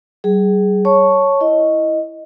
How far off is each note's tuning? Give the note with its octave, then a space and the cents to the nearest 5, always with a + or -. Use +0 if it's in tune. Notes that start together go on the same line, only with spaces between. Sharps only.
G3 -40 G#4 +0
C#5 +0 A5 +0 C#6 +0
E4 +0 D#5 +0